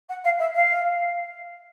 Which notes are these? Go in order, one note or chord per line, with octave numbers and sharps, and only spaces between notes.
F#5
F5
E5
F5